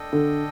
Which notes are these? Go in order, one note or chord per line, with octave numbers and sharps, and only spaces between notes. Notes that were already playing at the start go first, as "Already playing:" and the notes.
Already playing: D4 A4 D#5 G5
D3